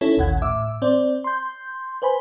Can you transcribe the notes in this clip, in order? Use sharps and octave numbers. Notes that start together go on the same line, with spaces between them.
C#4 D#4 E4 A4 C#5
A1 D#2 A#2 F#5 G#6
A2 E5 D6 E6
C4 C5 D5
C6 G6
B4 C5 G#5 B5